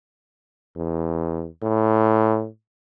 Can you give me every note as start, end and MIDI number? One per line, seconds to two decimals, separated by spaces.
0.76 1.46 40
1.62 2.47 45